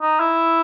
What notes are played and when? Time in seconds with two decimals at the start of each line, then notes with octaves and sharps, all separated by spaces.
0.01 D#4
0.20 E4